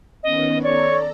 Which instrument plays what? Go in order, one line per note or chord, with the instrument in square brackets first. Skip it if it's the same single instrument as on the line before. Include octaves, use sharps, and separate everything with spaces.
[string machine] D#3 B3 C#4 [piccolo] D#5
[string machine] A4 A#5 [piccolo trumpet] C#5 [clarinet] D5 [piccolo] C#6